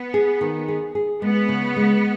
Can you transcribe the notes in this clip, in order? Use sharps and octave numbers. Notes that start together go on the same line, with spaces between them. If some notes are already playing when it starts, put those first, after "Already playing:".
Already playing: B3
G#4
D#3
G#4
G#4
G#3 B3
C#3
G#3